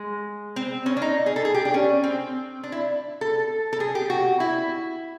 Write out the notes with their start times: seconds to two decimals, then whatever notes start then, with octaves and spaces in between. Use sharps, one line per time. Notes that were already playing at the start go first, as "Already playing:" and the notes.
Already playing: G#3
0.56 C4
0.86 C#4
0.97 D4
1.02 D#4
1.26 G#4
1.36 A4
1.45 G#4
1.54 G4
1.65 D4
1.74 C#4
2.04 C4
2.63 D4
2.72 E4
3.21 A4
3.73 A4
3.80 G#4
3.95 G4
4.10 F#4
4.40 E4